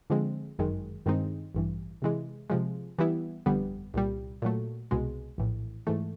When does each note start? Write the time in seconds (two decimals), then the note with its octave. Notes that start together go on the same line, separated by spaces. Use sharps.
0.10 D3 F3 G#3 C4
0.58 G1 F#2 D#3 G#3
1.06 G2 D#3 G#3 C4 D#4
1.55 A1 G2 E3
2.02 C3 E3 G#3
2.50 C3 F3 G#3
2.99 E3 G3 B3 E4
3.46 G1 F2 D3 G3 B3
3.94 C2 A#2 G3
4.42 A#2 F#3 A3
4.91 C2 B2 G#3
5.38 A#1 A2 E3
5.87 G#2 E3 A3